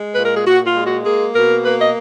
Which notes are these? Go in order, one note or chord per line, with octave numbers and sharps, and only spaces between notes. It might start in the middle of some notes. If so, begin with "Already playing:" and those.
Already playing: G#3
A#2 B4
A#4
G#4
A#2 F#4
F4
G#3
F#4
A#3 G#4
B2 A#4
A#3 B4
D#5